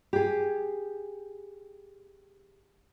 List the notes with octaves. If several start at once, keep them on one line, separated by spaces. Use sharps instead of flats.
G4 G#4